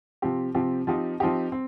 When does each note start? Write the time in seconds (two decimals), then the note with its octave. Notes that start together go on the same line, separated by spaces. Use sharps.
0.22 C3 F3 C4 G4
0.54 C3 F3 C4 G4
0.87 F3 C4 D#4 G4
1.20 F3 C4 D#4 G4
1.52 C4